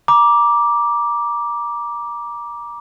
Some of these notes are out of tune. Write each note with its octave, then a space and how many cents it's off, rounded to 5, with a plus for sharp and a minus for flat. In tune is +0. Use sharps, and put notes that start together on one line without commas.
A#5 +30 D6 +0